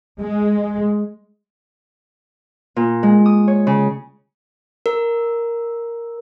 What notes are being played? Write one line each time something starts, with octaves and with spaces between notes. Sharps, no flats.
G#3
A#2
G#3
D#6
C#5
C#3
A#4